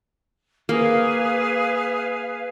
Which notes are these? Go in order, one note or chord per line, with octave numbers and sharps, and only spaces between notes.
A#3 G#4 B4 F5